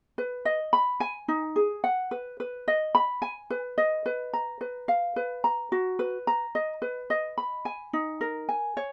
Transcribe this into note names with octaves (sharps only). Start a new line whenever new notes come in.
B4
D#5
B5
G#5
D#4
G#4
F#5
B4
B4
D#5
B5
G#5
B4
D#5
B4
A#5
B4
F5
B4
A#5
F#4
B4
A#5
D#5
B4
D#5
B5
G#5
D#4
A#4
G#5
C#5